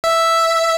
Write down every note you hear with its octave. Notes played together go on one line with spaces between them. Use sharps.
E5